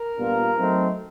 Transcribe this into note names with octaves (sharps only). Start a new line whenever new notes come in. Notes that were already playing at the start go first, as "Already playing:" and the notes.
Already playing: A#4
A#2 G3 B3 D4 F4
F#3 A3 C4 D#4